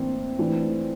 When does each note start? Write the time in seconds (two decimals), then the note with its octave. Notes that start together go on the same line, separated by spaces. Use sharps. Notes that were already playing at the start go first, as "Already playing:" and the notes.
Already playing: A2 E3 A#3 C4 D4
0.39 E3 A3 D4 F4